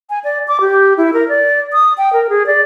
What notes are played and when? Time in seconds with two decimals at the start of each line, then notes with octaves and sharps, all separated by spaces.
0.10 G#5
0.24 D5
0.48 D6
0.61 G4
0.97 E4
1.13 A#4
1.29 D5
1.73 D#6
1.98 G5
2.13 A#4
2.29 G#4
2.46 D5